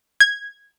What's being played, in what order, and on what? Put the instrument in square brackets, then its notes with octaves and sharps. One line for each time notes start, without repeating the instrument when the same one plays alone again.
[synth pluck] G#6